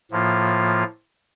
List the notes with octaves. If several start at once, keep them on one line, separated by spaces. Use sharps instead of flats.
A2 F3 A#3 F4